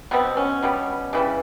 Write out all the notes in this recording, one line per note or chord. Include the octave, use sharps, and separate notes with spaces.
B2 G3 B3 C4
C#4
B2 G3 B3
C#3 E3 G3